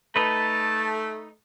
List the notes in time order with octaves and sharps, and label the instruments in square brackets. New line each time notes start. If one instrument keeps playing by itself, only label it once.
[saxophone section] A3 [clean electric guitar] D#4 B4 [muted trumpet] A5